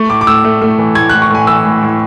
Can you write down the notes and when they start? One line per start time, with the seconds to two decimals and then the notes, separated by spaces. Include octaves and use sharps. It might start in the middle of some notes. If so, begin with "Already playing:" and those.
Already playing: A3 C#6
0.09 A2 D6
0.21 D6
0.27 A2 E6
0.44 A3
0.61 A3
0.79 E3
0.95 A2 G#6
1.10 A2 F#6
1.22 C#6
1.30 A2 G#5
1.47 E3 E6
1.66 A2
1.83 A2